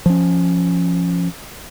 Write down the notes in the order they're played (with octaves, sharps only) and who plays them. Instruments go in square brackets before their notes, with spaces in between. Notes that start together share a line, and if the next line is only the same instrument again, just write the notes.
[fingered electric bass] F3 C#4